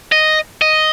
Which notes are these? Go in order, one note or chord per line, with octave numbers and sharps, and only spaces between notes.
D#5
D#5